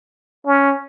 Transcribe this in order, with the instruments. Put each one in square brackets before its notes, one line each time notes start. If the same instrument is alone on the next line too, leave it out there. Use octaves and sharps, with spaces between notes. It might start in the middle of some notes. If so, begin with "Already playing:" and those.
[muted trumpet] C#4